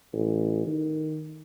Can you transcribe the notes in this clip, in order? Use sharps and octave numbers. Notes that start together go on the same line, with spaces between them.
A1
D#3